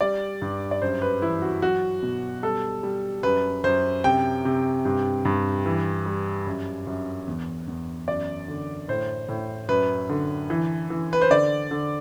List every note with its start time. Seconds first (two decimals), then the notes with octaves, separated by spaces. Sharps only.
0.01 G3 D5
0.42 G2
0.71 D5
0.82 F#2 C5
1.02 B4
1.22 E3 E4
1.42 F#4
1.62 F#3 F#4
2.03 B2
2.43 G3 A4
2.83 G3
3.23 F#2 B4
3.64 F#2 C5
4.04 C3 G5
4.45 C3
4.85 G2
5.25 G2
5.66 E3
6.06 G3
6.46 F#2
6.87 F#2
7.27 E2
7.68 E2
8.08 F#2 D5
8.48 D3
8.88 A2 C5
9.29 A2
9.69 F#2 B4
10.09 D3
10.50 E3
10.90 E3
11.13 B4
11.21 C5
11.30 D3 D5
11.71 D3